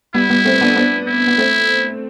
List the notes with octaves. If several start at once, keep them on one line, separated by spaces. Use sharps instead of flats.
G3 B3 E4
G3 B3
A3 C4
B3 D4
B3 D4
E4
B3
A3 C4